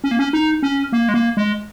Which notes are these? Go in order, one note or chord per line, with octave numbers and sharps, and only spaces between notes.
C#4
A#3
C#4
D#4
C#4
A#3
G#3
A#3
G#3